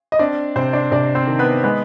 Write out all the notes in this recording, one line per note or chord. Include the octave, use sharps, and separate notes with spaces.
D#5
C4 D4 D5
C3 C4 C5
D4 D5
C3 D4 D5
C4 C5
D#3
B3 B4
G#3 B3 B4